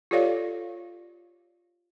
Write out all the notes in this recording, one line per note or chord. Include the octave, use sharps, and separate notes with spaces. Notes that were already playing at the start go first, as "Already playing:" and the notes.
F4 G4 A4 C#5 D5 F5